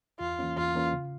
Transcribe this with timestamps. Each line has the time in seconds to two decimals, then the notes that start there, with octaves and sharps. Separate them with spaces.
0.20 E2 F4
0.39 E3 A#3 C#4
0.56 E2 F4
0.75 E3 A#3 C#4
0.93 C#3